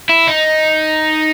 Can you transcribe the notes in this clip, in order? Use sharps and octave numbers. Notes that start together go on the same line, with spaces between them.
E4
D#4